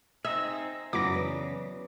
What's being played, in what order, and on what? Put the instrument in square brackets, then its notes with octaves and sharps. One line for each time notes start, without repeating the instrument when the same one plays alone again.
[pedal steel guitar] C4 D#4 G#4 [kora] E5 [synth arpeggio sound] E6
[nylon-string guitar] F#2 A#2 E4 [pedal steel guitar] C#3 [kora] F#3 B3 [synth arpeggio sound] D6 A#6
[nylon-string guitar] E3 D4 B4